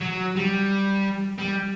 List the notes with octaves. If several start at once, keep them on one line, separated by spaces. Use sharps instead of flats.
F#3
G3
G3